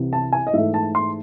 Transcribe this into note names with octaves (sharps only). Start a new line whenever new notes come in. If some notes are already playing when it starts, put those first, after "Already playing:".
Already playing: C2 C3 E3
A5
G#5
D#5
G#2 E3 A3 E5
A5
C6